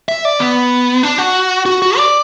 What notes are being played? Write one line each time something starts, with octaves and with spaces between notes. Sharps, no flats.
E5
D5
B3
D4
F#4
F#4
F#4
D5